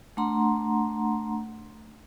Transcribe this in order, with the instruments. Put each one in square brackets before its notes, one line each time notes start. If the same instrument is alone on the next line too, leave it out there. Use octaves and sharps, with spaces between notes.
[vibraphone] A3 D4 F#5 A#5 C6